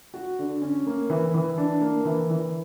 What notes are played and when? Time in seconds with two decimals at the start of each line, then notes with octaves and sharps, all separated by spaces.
0.14 F#4
0.39 D3
0.61 C#4
0.87 A#3
1.10 E3
1.34 E3
1.58 D4
1.81 A#3
2.05 E3
2.30 E3